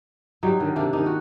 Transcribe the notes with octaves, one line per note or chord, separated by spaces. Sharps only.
F#3 G3 D#4
D3 D#3 G3
C3 A#3 D4
D#3 D4 D#4
F#4